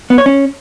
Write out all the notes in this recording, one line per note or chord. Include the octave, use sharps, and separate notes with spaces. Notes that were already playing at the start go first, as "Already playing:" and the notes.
B3
C#5
C#4